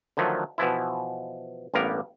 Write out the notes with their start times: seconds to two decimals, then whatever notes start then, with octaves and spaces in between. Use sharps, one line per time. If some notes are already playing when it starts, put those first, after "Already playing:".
0.17 D3 D#3 F3 F#3 A3
0.58 B2 E3 F3 E4
1.74 A1 G2 G3 A#3 B3 A#4